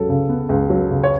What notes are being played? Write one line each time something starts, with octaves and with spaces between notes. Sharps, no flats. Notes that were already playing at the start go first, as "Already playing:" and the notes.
Already playing: C#2 F#3 A4
C#3
B3
C#2
F#3
C#3
C#5